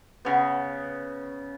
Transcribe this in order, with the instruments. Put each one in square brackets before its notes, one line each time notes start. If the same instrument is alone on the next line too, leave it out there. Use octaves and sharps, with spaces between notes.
[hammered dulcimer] C#3 B3